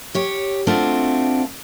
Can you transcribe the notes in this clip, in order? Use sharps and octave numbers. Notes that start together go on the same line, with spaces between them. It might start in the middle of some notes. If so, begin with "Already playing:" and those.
G4 C#5
A3 C4 D4 F4 F#4